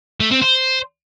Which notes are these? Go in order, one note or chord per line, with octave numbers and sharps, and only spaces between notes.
A3
C4
C5